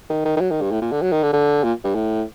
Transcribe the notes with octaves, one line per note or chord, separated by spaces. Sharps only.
D#3
D#3
D#3
F#3
D#3
G2
A2
A#2
D3
F#3
D#3
D3
D3
A#2
G2
A2